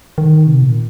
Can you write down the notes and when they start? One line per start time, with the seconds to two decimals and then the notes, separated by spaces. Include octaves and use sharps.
0.18 D#3
0.47 C3
0.62 A#2